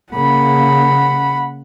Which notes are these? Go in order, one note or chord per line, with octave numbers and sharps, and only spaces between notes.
C#3 A#3 F#5 B5